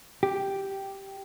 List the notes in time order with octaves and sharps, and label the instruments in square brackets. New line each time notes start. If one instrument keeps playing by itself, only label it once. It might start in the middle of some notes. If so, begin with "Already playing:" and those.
[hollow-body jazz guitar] G4